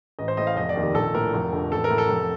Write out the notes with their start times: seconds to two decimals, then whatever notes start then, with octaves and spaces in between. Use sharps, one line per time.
0.19 A1 D#5
0.28 C5
0.37 A2 D#5
0.47 F5
0.56 F1 D#5
0.69 D5
0.76 D#2 D#3
0.82 G4
0.94 A#1 A4
1.14 A2 A#4
1.34 F1
1.52 F2 D3
1.71 A1 A4
1.84 A#4
1.90 A2
1.98 A4
2.09 F1